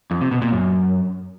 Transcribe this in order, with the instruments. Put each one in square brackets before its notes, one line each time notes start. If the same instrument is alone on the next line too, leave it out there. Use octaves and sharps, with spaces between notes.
[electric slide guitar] F2
C3
B2
A#2
F#2